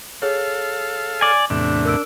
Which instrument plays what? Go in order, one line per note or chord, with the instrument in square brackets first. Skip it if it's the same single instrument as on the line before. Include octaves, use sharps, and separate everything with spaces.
[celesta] G#4 C#5 [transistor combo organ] A4 F5
[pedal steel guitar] D5 G#5
[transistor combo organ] E2 A2 C3 [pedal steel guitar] D4
[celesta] A#4 E6 D7